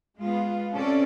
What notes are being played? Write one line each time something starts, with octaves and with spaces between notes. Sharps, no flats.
G#3 B3 F4
C3 C#4 A4 D5